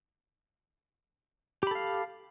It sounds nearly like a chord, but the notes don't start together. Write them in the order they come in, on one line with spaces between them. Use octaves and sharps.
G4 B5 A4 F5